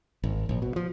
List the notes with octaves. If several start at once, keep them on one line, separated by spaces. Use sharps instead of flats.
G#1
A#1
B2
F3